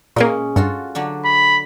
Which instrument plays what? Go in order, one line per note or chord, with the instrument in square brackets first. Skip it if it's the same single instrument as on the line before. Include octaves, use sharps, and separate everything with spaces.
[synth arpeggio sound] A#2 A#3 [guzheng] G#3 C#4 G#4
[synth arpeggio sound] G2 [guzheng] F4 F#4 A4
[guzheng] D3 F#3 D4
[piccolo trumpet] B5